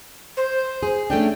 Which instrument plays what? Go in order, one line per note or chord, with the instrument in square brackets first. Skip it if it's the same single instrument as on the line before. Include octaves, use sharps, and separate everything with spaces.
[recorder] C5
[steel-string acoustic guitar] G#4
[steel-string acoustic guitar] A3 C#4 D4 [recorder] G5